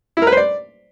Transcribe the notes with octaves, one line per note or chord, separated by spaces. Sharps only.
E4
A#4
B4
C5
D5